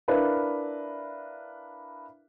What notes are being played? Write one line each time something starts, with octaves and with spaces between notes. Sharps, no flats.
D4 E4 A#4 B4 E5 F5